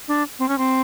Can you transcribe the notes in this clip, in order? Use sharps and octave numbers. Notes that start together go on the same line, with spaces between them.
D4
C4
C#4
C4